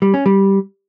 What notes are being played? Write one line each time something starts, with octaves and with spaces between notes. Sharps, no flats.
G3
C#4
G3